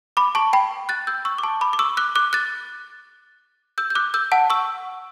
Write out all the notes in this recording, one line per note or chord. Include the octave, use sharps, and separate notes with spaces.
B5 D6
A5 C#6
G5 B5
F#6 A6
E6 G6
C#6 E6
D6
A5 C#6
B5 D6
D6
C#6 E6
D6 F#6
D6 F#6
F#6 A6
E6 G6
G6
D6 F#6
E6 G6
F#5 A5
C#6 E6